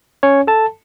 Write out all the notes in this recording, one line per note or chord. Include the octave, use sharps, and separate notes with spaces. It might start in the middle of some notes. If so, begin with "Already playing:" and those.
C#4 C#5
A4 A5